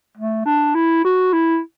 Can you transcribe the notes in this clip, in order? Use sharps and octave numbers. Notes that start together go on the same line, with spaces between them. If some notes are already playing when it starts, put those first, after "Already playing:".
A3
D4
E4
F#4
E4